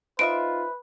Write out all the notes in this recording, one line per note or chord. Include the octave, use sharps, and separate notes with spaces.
D#4 F4 B4 C5 D#5 E5 D7